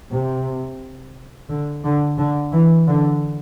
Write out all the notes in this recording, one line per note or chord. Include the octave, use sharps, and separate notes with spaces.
C3
D3
D3
D3
E3
D3